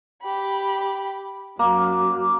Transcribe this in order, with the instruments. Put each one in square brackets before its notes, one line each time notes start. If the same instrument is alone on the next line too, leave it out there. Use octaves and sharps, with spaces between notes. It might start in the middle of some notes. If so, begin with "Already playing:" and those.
[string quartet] G4 B5
[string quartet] F#2 F#3 [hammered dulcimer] A#3